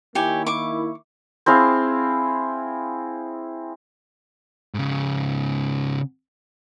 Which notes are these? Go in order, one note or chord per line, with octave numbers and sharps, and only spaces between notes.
D#3 A#3 E4 G4 C#5 G#5
C#6 D6
C4 E4 G#4 F5
G#2 C#3